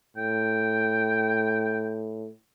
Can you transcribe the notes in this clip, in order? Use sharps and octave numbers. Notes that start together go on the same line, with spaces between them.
A2 G5